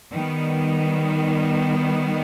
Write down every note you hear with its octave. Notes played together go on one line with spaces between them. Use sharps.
D#3 G3 B3